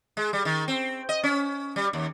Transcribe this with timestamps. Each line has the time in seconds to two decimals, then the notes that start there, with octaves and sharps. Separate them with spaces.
0.17 G#3
0.33 G3
0.45 D#3
0.68 C4
1.09 D#5
1.23 C#4
1.76 G3
1.93 D#2